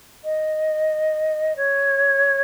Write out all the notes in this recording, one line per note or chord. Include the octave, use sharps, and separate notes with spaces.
D#5
C#5